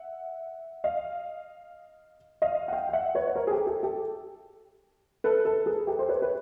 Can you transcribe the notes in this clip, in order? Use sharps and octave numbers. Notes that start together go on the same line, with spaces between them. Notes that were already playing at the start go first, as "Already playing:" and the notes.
Already playing: E5 F#5
D#5 F5
D#5 F5
F#5
F5 G5
G5
E5 F#5
B4 C#5
C#5
A#4 C5
G#4
G4 A4
G4 A4
G4 A4
A4 B4
A4 B4
G#4 A#4
G4 A4
C5
B4 C#5
B4